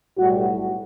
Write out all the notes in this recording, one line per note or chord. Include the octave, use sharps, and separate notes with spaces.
B1 A2 G3 F#4